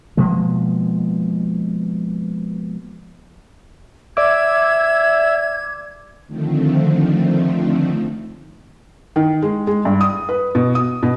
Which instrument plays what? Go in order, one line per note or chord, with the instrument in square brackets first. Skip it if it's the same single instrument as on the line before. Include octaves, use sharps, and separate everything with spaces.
[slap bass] B2 F3 G#3 A#3
[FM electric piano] D5 D6 [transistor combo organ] E5 [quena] G#6
[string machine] D3 D#3 F3 A3 C4
[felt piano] D#3
G#3
G#3
G2
D#6
B4
B2
D#6
B2